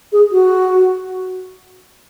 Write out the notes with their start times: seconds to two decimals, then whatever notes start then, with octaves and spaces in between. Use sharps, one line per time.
0.12 G#4
0.32 F#4